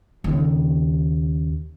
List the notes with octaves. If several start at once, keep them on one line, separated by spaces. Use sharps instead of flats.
D#2 C#3